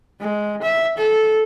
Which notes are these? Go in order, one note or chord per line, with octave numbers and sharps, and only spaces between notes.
G#3
E5
A4